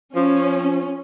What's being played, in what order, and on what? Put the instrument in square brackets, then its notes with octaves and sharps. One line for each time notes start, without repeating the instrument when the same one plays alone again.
[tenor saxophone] F3 [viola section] C#4